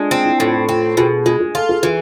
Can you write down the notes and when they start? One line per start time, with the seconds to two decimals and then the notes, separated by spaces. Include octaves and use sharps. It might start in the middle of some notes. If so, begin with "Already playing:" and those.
Already playing: G#3 D4 F4
0.11 C4 D4
0.25 E4
0.39 A2 F4
0.54 F4
0.68 C4 F4
0.97 B2 G#4
1.26 G#3 G#4
1.40 G#4
1.55 F4 A4
1.69 G#4
1.83 E3 G#4